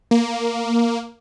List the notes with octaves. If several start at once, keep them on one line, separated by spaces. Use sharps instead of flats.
A#3